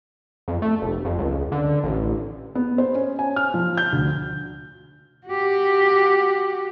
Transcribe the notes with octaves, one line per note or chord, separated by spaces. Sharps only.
F2
A3
F1
F2
C#2
D3
A1
B3
C5
C#4
G#5
F6
F3
G6
D2
F#4 G4